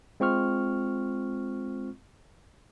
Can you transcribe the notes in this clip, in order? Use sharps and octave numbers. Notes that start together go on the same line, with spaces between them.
G#3 C4 F4 C#6 F6